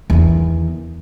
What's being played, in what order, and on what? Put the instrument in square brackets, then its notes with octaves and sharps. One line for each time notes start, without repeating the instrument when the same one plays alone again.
[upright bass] E2 D#3